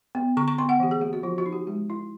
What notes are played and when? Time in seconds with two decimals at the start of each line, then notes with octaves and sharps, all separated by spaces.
0.15 B3
0.37 D3 C#6
0.48 C#6
0.58 B3 C6
0.69 F#5
0.80 E3 G4
0.91 G#4
1.01 A#3 G4
1.13 F#4
1.23 F3 F4
1.38 F#4
1.46 D#4
1.53 G4
1.67 G#3 G4
1.90 E4